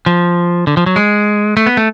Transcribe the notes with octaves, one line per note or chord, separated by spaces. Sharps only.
F3
D3
F3
F#3
G#3
A3
B3
A3